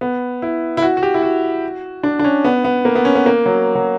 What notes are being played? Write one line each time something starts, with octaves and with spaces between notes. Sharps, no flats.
B3
E4
E4
F#4
F#4
G4
E4
F#4
D4
D4
C#4
B3
B3
A#3
B3
C#4
B3
A#3
F#3
F#3